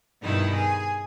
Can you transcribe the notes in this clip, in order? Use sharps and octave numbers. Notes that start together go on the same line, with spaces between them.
G2 B2 D#3 D#4 E4
G#4